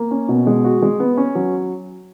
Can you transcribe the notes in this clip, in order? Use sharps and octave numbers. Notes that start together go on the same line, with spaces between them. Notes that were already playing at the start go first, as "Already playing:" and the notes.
Already playing: A#3
C#4
B2
G#3
F#4
G#3
B3
C#4
F#3